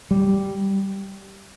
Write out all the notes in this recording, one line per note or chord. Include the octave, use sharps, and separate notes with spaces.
G3